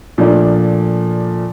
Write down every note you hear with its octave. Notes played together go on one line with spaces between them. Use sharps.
A#2 F3 A3 D4